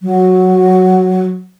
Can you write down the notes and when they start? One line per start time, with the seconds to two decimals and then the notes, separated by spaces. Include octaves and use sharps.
0.02 F#3